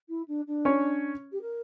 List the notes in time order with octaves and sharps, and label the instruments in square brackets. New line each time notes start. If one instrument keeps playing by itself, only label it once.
[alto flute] E4
D4
D4
[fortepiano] C#4 C#5
[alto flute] G4
A#4